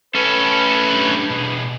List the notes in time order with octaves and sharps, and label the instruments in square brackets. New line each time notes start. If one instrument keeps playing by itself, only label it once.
[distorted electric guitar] A2 C#4 [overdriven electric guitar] A4 [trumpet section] B4
[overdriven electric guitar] D4 B5
B2 G#4